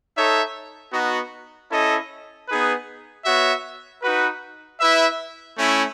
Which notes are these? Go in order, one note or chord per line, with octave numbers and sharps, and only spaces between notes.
D#4 A4 C#5 E5
B3 D#4 F#4
C#4 E4 A4 D#5
B3 D#4 G#4 B4
B3 F#4 C#5 E5
D#4 F#4 B4
E4 B4 E5
A3 C#4 E4